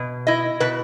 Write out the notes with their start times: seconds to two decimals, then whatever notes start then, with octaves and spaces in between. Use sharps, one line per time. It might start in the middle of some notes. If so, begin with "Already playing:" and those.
Already playing: B2
0.27 E4 D#5
0.60 B2 B4